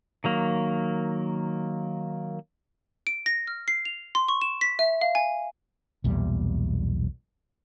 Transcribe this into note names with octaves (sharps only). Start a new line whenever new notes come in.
D#3 F#3 A#3
D7
A#6
F6
C7
F7
C6
C#6
E7
B6
E5
F5
G#5
B1 E2 A#2 G3